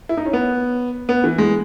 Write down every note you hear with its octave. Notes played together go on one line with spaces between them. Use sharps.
E4
D#4
C#4
B3
B3
E3
G#3